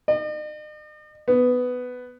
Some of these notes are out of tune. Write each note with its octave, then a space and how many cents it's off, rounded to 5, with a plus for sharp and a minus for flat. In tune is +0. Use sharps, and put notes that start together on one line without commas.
D#5 -45
B3 +10